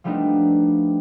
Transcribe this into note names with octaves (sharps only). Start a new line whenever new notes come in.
F3 G3 A3 B3 D4 D#4